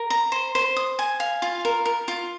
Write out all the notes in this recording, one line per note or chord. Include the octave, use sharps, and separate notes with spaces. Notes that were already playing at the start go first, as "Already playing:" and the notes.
Already playing: A#4
A#5
C5
C5
D#6
G#5
F5
F4
A#4
A#4
F4